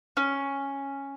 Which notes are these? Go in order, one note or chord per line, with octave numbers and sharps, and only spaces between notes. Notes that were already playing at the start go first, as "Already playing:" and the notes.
C#4